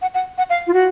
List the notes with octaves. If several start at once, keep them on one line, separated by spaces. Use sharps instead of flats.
F#5
F#5
F#5
F5
F4
F#4